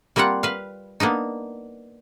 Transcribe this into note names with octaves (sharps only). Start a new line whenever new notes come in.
G3 A#3 C4 F4 F#5
B4 F5
A#3 B3 D4 D#4